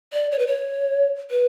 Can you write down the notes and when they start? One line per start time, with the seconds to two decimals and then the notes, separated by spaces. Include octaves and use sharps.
0.13 D5
0.32 C#5
0.39 B4
0.47 C#5
1.31 B4